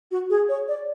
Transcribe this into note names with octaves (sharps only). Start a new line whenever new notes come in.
F#4
G#4
C#5
D5